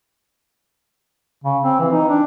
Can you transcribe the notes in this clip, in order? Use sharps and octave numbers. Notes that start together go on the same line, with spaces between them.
C#3
C4
E3
D#4
D4